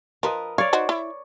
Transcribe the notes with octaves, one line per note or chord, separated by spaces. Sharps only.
F3 A#4 B4 D#5
C#5 D5 F5
D#4 F#4 C5
E4